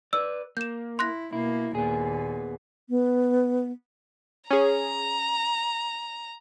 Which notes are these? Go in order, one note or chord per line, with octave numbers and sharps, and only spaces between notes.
B4 D5 E6
A#3 G6 E7
E4 C6 F#6 A#6
B2 A#3 E4
D#2 A#2 B3 G#4
B3
C#4 G#4 A#5